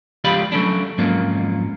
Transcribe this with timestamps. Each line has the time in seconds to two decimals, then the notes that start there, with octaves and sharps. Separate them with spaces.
0.24 C#2 F3 G4 D5 F5 B5
0.52 F#3 A3 C#4 D4
0.98 F2 G#2 F#3 A#3 C#4 F4